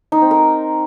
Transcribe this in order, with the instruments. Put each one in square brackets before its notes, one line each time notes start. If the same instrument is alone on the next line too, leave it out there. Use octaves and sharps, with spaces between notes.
[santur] D#4
C4
A#4